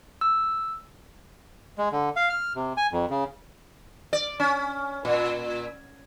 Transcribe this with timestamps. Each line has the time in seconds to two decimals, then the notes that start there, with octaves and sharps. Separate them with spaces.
0.21 E6
1.78 G#3
1.92 D3
2.16 F5
2.29 F6
2.55 C3
2.77 G#5
2.93 F2
3.10 C#3
4.13 D5
4.40 C#4
5.05 A#2